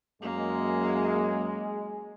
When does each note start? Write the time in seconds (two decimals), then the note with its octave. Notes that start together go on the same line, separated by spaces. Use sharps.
0.22 F#2 G#3 A#3